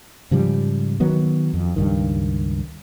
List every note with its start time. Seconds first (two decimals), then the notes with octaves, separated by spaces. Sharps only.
0.31 G#2 C#3 F3 G3
1.00 D#3 F#3 B3
1.54 F2
1.76 C#2 G2 D#3